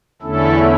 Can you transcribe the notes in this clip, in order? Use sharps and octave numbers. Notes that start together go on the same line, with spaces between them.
E2 D3 A3 C#4 E4 A4